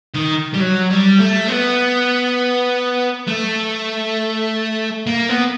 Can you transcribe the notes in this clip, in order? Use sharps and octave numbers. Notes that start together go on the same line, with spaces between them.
D#3
G3
F#3
G3
A3
B3
A3
A#3
B3